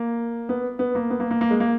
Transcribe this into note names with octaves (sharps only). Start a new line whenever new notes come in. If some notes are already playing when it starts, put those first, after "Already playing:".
Already playing: A#3
B3
B3
A#3
B3
A#3
A#3
A#3
G#3
A#3